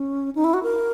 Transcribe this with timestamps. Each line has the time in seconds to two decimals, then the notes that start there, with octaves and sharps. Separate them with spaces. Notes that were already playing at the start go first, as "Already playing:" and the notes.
Already playing: C#4
0.35 D#4
0.44 E4
0.54 F#4
0.63 A#4